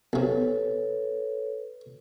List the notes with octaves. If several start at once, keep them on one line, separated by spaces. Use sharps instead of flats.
B1 C3 A4 B4 C#5